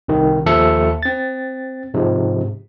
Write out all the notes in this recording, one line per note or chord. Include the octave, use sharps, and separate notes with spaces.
C2 C3 D#3
D#2 F3 A4 E5 C#7
C4 A6
G#2 C3 F3 G#3